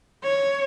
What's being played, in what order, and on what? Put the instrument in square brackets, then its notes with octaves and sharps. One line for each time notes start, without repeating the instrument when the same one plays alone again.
[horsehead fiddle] C#5